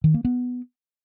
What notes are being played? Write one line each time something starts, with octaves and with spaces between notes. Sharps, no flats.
D#3
A#3
B3